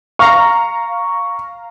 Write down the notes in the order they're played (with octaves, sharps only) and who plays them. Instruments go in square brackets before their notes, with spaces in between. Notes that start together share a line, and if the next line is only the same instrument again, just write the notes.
[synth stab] F5 A#5 [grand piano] C#6